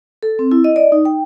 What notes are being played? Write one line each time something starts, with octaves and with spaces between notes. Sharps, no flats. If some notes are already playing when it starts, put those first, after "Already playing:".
A4
C4
E4
D#5
D5
D#4
G5